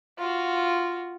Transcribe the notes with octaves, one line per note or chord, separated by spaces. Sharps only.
F4 F#4